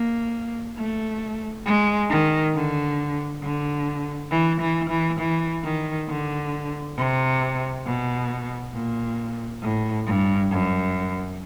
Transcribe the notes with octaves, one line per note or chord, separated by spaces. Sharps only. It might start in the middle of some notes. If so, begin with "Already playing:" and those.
Already playing: A#3
A3
G#3
D#3
D3
D3
E3
E3
E3
E3
D#3
D3
C3
B2
A#2
A2
G2
F#2